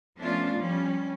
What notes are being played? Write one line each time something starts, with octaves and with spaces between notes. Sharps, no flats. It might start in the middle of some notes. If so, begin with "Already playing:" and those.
F3 A3 B3 C#4 D4 F4
F3 G3 C#4